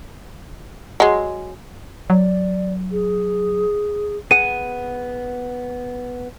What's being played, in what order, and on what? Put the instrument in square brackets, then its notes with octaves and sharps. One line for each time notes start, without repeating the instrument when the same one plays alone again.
[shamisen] F#3 G#3
[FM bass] F#3 [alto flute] D5
[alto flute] G#4
[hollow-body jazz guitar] B3 G#4 F#5 [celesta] D#7